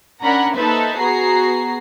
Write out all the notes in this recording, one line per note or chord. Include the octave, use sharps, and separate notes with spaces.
C#4 D4 A#4 F#5 A#5 B5
A#3 D#4 A4 B4 C5 E5
B3 F#4 G#4 A#5 C7